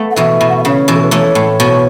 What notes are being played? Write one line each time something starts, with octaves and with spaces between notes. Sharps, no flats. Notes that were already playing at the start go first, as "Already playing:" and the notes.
Already playing: A3 B3
F#5
B2 E3 E5
B2
F#5
E5
C#3 C#5
B2 E3
A4
B4
E3 A3 C#5
A2
B2